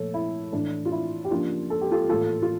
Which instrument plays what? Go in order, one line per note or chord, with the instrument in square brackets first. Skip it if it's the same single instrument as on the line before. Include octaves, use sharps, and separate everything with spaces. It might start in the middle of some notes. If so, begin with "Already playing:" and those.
Already playing: [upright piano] A#2 F3 A3 A4 C#5
E4
A2 E3 A3 D4
F4
E4
G4
C#3 F3 A#3 D4 F4
A4
G4
F4 A4
A2 E3 A#3 F4 A4
F4